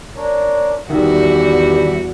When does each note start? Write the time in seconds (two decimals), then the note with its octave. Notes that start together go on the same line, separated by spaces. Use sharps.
0.16 D4 A#4 C#5
0.90 E2 G2 D#3 E3 G3 F#4 E5